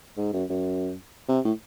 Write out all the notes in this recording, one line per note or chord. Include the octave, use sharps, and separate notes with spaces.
G#2
F#2
F#2
C3
A2